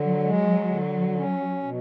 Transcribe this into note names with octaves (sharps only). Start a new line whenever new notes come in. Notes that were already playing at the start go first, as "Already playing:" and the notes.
Already playing: D3 F#3
G#3
D3
C#4
B2